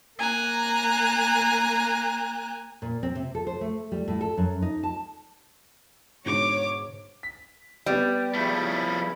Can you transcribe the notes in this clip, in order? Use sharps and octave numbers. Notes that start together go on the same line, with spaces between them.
A#3 G#5 A#5 F#6
A#2
C4
C3
A4
C5
A3
G3
A2
A4
F#2
D#4
A5
G#2 B2 D3 C#5 D6
B6
G3 B3 G4 D5
C#3 F3 A3 E4 B5